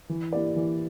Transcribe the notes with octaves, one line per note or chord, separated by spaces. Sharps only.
E3
A#3 E4 G4 D5
E3